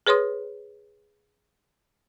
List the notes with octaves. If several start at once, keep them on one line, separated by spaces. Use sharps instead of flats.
G#4 B4 C#5 C6 D#6